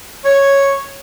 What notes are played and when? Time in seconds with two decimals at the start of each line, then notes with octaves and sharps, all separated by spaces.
0.24 C#5